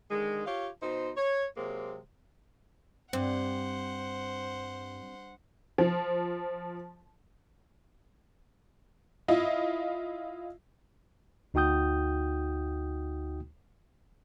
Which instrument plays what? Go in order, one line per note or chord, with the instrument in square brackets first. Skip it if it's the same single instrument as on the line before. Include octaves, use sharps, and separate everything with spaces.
[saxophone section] D3 D#3 G#3
F4 G4 C#5 F5
B2 D#4 C5
C#5
C3 F#3 G#3 A#3 C4
[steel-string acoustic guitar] G2 [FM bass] C4 [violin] C5 F#5
[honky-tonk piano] F3
E4 F4 D#5
[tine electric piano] D2 D#4 F#4 G5 D#6 G6